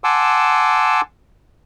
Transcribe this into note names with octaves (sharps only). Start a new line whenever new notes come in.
F#5 G#5 A5 C6 D6 E6